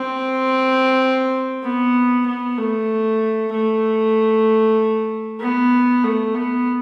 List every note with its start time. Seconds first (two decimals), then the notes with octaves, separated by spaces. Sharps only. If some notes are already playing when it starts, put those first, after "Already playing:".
Already playing: C4
1.63 B3
2.26 B3
2.58 A3
3.52 A3
5.40 B3
6.04 A3
6.35 B3